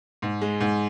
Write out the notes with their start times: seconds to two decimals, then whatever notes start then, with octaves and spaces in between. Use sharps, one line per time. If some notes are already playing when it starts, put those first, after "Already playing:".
0.22 G#2
0.41 G#3
0.60 G#2